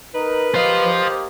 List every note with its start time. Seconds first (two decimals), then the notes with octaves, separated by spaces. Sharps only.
0.14 D#4 A#4 B4
0.54 A#3 G4 C5 D#5 F5